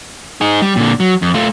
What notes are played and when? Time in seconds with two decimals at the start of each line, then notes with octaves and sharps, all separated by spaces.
0.41 D#4 G#4
0.62 G3
0.76 A#2 D3
1.00 F#3
1.22 F2
1.34 A3 F4